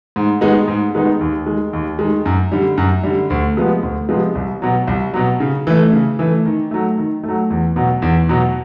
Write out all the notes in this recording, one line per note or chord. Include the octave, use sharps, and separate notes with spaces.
G#2
D#3 G#3 B3 D#4
G#2
D#3 G#3 B3 D#4
D#2
D#3 G#3
D#2
D#3 G#3
F#2
D3 G3
F#2
D3 G3
D2
C3 F3 G#3 B3
D2
C3 F3 G#3 B3
C2
B2 F#3
C2
B2 F#3
C#3
E3 A3
C#3
E3 A3
D#3
F#3 A3
D#3
A3
F#3
E2
B2 F#3
E2
B2 F#3